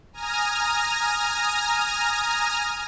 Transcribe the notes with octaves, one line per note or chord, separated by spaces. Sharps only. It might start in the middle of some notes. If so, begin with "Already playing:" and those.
G#5 A#5 D#6 F6 A#6